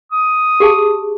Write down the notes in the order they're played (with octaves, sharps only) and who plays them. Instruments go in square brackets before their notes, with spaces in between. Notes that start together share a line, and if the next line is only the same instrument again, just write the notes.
[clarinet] D#6
[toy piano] G4 G#4 A5